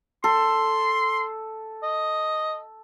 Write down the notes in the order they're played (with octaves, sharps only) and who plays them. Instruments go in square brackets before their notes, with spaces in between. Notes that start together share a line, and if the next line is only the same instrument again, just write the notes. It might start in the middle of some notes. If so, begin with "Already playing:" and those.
[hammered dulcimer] A4 [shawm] C6
[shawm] D#5